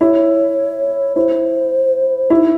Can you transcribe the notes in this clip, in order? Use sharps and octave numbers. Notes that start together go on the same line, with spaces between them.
E4 C#5
E4 C5
D#4 E4